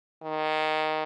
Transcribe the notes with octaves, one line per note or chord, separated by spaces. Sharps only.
D#3